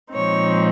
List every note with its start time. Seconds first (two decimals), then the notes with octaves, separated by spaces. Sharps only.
0.13 A#2 F3 G#3 C4 D#4 C#5